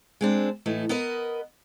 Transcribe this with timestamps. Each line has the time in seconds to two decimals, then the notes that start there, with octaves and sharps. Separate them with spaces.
0.21 G#3 C4 D4
0.66 A2 E3 A3 D#4
0.89 B3 A#4 B4 D#5